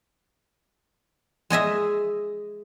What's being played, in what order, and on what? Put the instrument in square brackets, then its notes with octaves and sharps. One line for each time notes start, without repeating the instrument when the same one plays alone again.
[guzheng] G#3 G#4 D#5 E5